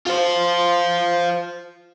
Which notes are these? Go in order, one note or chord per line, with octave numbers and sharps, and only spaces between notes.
F4 C5